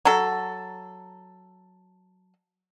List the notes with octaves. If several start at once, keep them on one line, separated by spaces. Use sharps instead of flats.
F#3 A4